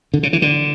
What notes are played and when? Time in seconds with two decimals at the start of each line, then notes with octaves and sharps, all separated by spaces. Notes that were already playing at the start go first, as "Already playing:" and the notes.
0.14 D3
0.23 C#3
0.33 E3
0.42 D3